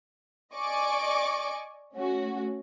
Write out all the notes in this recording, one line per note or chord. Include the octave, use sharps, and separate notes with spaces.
D5 D#5 G#5 C#6 D6
A3 C#4 F#4